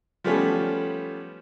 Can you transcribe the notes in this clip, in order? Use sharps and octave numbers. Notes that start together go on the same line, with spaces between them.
F3 G3 A3 B3 C#4